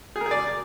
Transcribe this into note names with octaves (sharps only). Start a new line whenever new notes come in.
G#4
A#4
G#4
D5